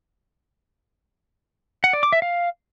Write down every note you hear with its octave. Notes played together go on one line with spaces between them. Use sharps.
F#5
D5
D6
E5
F5